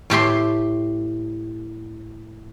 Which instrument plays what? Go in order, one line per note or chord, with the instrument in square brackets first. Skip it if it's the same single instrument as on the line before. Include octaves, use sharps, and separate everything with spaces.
[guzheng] A2 G4 E5 C6